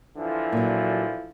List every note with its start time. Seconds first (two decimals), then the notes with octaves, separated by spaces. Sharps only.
0.17 D3 E3 F3
0.52 A#2 F#3